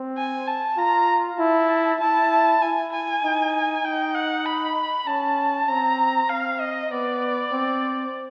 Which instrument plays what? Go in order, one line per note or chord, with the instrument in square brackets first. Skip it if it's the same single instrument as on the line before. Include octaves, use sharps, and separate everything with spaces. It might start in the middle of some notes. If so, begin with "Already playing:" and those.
Already playing: [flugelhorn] C4
[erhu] G#5
A5
[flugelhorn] F4 [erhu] A#5
[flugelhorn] E4 [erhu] A5
[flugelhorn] E4 [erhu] A5
[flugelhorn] E4 [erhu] G#5
[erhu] G#5
[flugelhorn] D#4
[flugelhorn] D#4 [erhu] G5
[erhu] F#5
B5
[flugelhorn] C#4 [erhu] A5
[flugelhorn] C4 [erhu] A#5
[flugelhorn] C4 [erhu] F5
[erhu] D#5
[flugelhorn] B3 [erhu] D5
[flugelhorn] C4